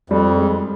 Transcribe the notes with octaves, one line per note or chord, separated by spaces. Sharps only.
F2 G3
G#3